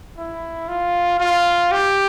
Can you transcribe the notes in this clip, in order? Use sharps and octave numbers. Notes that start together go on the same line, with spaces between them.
E4
F4
F4
G4